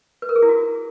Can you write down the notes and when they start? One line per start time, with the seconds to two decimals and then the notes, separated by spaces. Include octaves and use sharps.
0.22 B4
0.29 A#4
0.36 G#4
0.42 E4
0.49 F#4